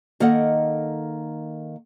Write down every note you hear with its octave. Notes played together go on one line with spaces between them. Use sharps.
D#3 A#3 A4 D#5 F#5